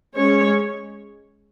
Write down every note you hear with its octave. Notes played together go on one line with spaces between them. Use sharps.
G#3 C#4 C#5